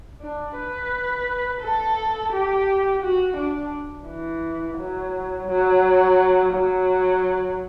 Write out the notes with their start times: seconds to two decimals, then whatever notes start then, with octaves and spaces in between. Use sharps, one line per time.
0.21 D4
0.57 B4
1.61 A4
2.32 G4
3.03 F#4
3.37 D4
4.07 E3
4.78 F#3
5.48 F#3
6.53 F#3